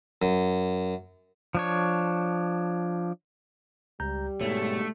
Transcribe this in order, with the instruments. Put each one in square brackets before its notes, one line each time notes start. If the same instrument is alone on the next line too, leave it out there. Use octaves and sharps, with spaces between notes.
[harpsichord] F#2
[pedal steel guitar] F3 D4 C#5
[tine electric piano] C#2 A#5 G6 [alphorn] G3
[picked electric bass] G#2 B2 [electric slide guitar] A3 [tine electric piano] C#5